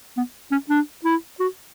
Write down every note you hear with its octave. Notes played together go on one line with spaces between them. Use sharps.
B3
C#4
D4
E4
F#4